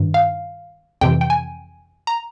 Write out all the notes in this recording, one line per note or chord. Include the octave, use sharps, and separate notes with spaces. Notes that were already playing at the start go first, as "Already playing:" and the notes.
Already playing: G2 D#3
F5
F2 C3 E3 G5
G5
G#5
A#5